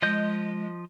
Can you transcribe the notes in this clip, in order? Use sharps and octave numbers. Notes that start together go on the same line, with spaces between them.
F3 G#3 D#5 G6